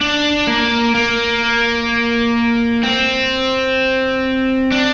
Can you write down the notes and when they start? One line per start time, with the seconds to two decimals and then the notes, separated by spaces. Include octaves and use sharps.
0.01 D4
0.47 A#3
0.95 A#3
2.83 C4
4.72 D4